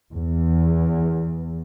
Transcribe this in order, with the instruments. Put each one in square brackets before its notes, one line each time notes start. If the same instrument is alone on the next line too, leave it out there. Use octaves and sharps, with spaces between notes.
[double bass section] E2